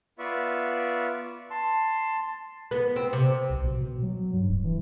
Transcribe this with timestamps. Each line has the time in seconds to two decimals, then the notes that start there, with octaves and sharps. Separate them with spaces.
0.19 B3 F4 B4 D5 E5 C#6
1.50 A5 C6
2.71 B3
2.96 C4
3.13 C3
3.50 B1
3.64 B2
3.81 B2
4.03 F#3
4.33 G2
4.49 D1
4.64 E3